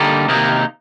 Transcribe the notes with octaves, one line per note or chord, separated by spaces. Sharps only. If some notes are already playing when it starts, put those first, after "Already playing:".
Already playing: D3 G3 A#3 D#4
C3 D#3 A#3 D#4